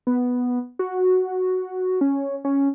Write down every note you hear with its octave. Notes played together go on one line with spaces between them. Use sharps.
B3
F#4
C#4
C#4